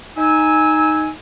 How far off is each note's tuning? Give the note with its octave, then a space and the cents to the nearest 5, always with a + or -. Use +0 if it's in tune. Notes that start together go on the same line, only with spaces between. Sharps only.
D#4 +0 G#5 +0 E6 -20